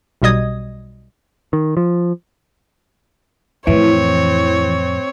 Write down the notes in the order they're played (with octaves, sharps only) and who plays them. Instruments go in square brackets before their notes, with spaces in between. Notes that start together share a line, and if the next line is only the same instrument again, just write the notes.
[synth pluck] B1 B2 G3 D#5 D#6 G#6
[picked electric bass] D#3
F3
[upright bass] F2 A2 [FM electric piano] E3 [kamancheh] C4 C#5